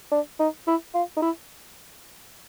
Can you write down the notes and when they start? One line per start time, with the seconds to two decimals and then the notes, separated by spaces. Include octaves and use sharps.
0.12 D4
0.40 D#4
0.67 E4
0.94 F4
1.17 D#4
1.22 E4